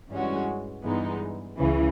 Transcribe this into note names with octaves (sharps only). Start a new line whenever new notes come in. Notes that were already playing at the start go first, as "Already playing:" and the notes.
G2 E3 G#3 C#4 F#4
G2 E3 G#3 B3 D#4
C#2 C#3 E3